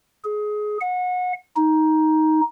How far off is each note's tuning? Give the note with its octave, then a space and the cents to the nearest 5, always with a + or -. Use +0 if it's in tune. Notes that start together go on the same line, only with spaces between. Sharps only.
G#4 +20
F#5 -30
D#4 +10